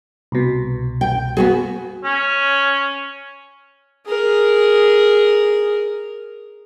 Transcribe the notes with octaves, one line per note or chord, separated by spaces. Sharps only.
C2 B2
G5
B3 F#4 G#4
C#4
G#4 A#4